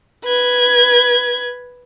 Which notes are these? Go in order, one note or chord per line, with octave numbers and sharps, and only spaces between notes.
B4 G#6